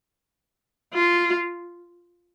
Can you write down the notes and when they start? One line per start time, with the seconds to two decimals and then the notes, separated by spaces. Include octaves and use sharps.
0.93 F4